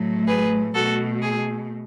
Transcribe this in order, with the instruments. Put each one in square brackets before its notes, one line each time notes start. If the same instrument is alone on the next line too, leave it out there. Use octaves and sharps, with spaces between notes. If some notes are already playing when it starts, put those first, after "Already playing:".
Already playing: [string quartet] A2 F#3 A3
G#4 B4
B2 A3 F#4 A4
G#4